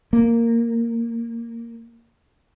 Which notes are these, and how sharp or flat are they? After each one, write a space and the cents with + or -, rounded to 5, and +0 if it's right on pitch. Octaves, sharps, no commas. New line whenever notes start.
A#3 -10